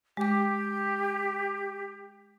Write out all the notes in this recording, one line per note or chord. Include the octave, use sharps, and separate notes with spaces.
G#3 G4 D6